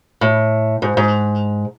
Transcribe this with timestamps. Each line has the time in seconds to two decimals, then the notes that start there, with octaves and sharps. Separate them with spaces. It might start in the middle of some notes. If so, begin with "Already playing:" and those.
0.21 A2
0.82 G#2
0.97 G#2